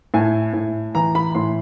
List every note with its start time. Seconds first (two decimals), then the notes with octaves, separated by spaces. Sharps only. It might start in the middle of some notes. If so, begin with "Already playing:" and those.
0.14 A2 G#5
0.53 A2
0.95 E3 A#5
1.15 B5
1.35 A2 C6